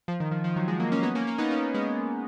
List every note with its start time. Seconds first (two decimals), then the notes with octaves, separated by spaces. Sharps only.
0.08 F3
0.20 D#3
0.31 F3
0.44 F3
0.56 D#3 F#3
0.68 F3 G#3
0.80 F#3 A#3
0.92 A#3 C#4
1.03 B3 D#4
1.15 A#3 C#4
1.27 A#3 C#4
1.38 B3 D#4
1.51 A#3 C#4
1.74 G#3 B3